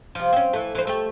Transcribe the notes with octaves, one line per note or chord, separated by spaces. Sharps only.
C3 F3
C4 C#4
E3 A3
E3 C5
A3 G4